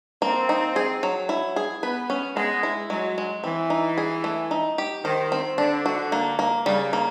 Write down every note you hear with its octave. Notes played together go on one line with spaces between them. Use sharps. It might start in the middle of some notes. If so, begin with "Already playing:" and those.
A#3 C4
D#4
G#4
F#3
E4
G#4
B3 B4
C#4
G#3 B3
E4
F#3 G#3
G#3
E3 C4
D#4
G#4
A3
D#4
G4
D#3 C5
C4
D3 D4
F#4
A#3
A#3
C#3 G3
A#3